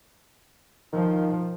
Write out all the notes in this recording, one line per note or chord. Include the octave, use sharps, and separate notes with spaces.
D#3 F3